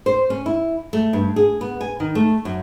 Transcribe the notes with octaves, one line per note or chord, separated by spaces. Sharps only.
C5
C#4
E4
A3
G2
G#4
B3
G#5
D#3
A3
F#2